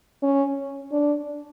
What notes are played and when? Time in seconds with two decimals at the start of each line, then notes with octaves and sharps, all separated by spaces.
0.23 C#4
0.92 D4